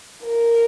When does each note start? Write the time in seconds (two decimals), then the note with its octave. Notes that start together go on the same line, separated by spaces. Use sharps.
0.24 A#4